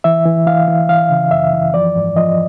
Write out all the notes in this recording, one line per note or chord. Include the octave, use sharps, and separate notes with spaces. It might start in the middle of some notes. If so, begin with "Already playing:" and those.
E3 E5
E3
E3 F5
E3
E3 F5
C#3
F#2 E5
E3
F3 D5
G#2
F3 D#5